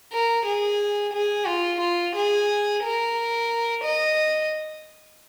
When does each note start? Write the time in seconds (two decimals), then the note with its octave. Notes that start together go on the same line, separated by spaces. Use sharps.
0.13 A#4
0.46 G#4
1.13 G#4
1.47 F4
1.81 F4
2.15 G#4
2.83 A#4
3.84 D#5